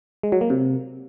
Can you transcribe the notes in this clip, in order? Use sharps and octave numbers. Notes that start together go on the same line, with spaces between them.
G#3
F#3
A#3
C3